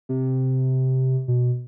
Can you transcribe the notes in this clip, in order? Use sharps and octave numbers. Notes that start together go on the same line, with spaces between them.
C3
B2